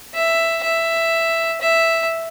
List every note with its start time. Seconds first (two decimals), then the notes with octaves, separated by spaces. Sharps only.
0.15 E5
0.63 E5
1.61 E5